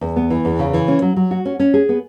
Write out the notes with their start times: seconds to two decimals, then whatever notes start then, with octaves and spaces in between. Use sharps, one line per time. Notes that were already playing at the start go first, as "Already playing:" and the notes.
0.01 E2
0.16 B3
0.30 E3
0.45 E2
0.59 C#3
0.73 E3
0.88 C#4
1.02 F#3
1.16 F#3
1.31 F#4
1.45 C#4
1.59 C#4
1.74 G#4
1.89 B3